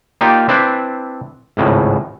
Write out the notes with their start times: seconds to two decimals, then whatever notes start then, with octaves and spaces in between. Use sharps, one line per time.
0.21 A#3 D#4 F4 G4 D5 G5
0.49 C4 D4 E4 B4 C5 D5
1.57 G#1 C#2 A2